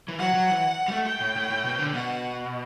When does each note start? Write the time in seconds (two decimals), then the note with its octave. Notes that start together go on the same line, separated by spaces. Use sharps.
0.08 E3
0.19 F#3 F#5
0.34 F#3
0.48 E3
0.88 G3
0.92 A3
1.06 G5
1.21 A2
1.36 A2
1.50 A2
1.65 B2
1.74 C3
1.79 D3
1.94 B2 F#5